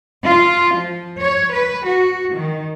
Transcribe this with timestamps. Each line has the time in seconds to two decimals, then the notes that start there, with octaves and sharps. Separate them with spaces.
0.25 F4
0.76 F3
1.21 C#5
1.52 B4
1.85 F#4
2.34 D#3